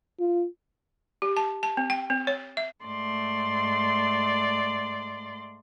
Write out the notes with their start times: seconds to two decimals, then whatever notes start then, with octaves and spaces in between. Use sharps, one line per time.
0.20 F4
1.22 G4
1.37 A5
1.63 A5
1.77 C4
1.90 G5
2.10 C4
2.27 C#5
2.57 E5
2.84 G#2 A3 D5 C6